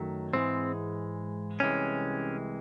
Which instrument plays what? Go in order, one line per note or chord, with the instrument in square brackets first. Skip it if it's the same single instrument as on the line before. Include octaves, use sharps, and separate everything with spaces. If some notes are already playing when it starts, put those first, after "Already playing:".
Already playing: [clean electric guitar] F#2 D#3 F#3 A3
G#2 E3 G#3 C4
C2 C3 E3 G#3 C#4